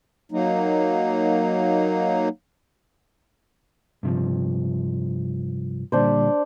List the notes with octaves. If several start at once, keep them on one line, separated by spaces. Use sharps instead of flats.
F#3 A#3 D#4
G2 C3 F3
A#2 D3 G3 D4 C5